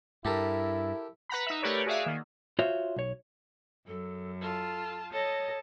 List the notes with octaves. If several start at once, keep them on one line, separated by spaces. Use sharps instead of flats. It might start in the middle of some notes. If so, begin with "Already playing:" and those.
G2 E4 G4 A4 A#4
B4 F#5 A#5 B5
D#4 E5
A3 G4 A#4 B4 C#5 D5
F#4 G#4 D5 E5 F5
D#3 A#3
F4 F#4 C5 C#5 E5
B1 C#5
F#2 A4
F4 A4 A5
A4 C#5 D#5